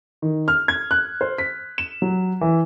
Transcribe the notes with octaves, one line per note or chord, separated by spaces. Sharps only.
D#3
F6
G#6
F#6
C5
B6
E7
F#3
E3